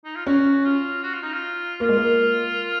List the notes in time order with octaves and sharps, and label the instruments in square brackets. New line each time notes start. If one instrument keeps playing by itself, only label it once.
[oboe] D#4
F4
[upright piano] C#4 [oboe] F#4
[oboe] F4
F#4
F4
D#4
F4
[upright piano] A#3 [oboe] F4
[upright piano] G#3
A#3